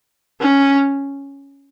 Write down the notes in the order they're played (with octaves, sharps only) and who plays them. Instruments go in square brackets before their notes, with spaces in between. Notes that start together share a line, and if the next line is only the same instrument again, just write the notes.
[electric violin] C#4